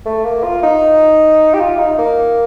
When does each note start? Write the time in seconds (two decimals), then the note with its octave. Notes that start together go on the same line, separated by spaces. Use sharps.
0.06 A3
0.25 A#3
0.44 F4
0.63 D#4
1.54 G4
1.60 F4
1.79 D#4
1.99 A#3